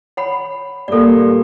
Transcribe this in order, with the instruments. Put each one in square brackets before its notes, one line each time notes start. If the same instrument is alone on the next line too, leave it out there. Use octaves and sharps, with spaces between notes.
[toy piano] C#5 F#5 B5
[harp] G2 A#2 [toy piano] A4 D5